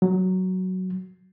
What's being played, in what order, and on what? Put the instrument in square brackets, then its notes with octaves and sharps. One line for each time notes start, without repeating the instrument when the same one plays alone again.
[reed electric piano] F#3